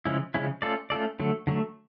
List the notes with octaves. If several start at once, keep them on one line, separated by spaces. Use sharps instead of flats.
C#3 F3 G#3 C#4 E4
C#3 F3 G#3 C#4 E4
A3 C#4 F4 A4 D5
A3 C#4 F4 A4 D5
D3 F#3 A3
D3 F#3 A3